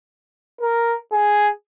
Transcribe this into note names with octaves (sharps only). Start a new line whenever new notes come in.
A#4
G#4